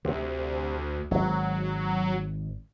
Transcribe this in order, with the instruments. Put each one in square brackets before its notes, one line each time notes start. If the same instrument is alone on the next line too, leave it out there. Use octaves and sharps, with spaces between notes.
[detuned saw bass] D2 [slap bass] C3
[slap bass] G#1 [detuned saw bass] F#3